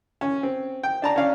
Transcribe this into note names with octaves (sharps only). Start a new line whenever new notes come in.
C#4
C4
G5
D4 A5 A#5
C#4 D4 F5